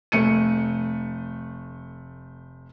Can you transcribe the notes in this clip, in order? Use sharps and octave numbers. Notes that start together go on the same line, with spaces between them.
F1 A3 C#7 D#7